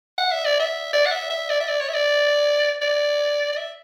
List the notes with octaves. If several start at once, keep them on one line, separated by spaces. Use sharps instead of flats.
F#5
E5
D5
E5
D5
F#5
E5
E5
D5
E5
D5
C#5
E5
D5
D5
D5
E5